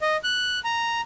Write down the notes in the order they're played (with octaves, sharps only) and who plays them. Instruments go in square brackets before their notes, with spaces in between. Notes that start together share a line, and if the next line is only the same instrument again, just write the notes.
[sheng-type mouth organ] D#5
F#6
A#5